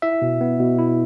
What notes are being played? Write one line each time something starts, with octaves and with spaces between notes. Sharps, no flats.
E4 E5
B2
B3
B2
E4